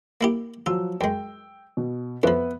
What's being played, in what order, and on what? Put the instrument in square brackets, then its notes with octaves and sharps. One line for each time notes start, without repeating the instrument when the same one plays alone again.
[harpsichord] A#3 E4 G4
[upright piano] F3 F#3 E6 [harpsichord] F4
[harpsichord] F#2 G#3 [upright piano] G5
[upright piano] B2
[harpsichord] F2 F3 [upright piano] B3 B4 E5